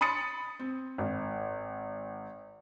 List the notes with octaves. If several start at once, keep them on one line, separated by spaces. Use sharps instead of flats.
B5 C6 D#6 A6 C#7
C4
G#1